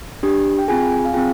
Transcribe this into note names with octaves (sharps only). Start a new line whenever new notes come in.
D4 G4
G5
C4 F4 G#4 G#5
G#5
F5
C4 F4 G#4 G5